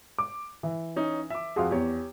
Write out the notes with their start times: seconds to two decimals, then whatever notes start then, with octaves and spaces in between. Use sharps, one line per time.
0.18 D6
0.63 E3
0.96 C#4 D#4
1.30 E5 D6
1.56 F2 F#4 G#4 F5 C6
1.71 E2 G4 C#5